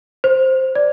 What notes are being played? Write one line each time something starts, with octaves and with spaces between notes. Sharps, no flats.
C5
D5